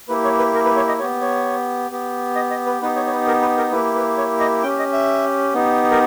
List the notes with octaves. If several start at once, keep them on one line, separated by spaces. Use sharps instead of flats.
A#3 E4 G4 B4
C#5
B4
A#4
B4
C#5
D#5
B3 G4 C#5
C#5
B3 G4
D#5
D#5
B4
B3 D#4 G4 B4
C#5
C#5
B4
A#4
B4
A#4
A#3 E4 G4 B4
B4
C#5
D#5
C#4 G4 G5
D#5
E5
B3 D#4 G4
A#4